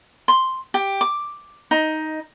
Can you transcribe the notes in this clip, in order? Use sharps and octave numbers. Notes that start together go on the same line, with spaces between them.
C6
G4
D6
D#4